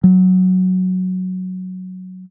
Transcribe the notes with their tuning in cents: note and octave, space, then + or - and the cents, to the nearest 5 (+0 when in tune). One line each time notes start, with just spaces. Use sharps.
F#3 +0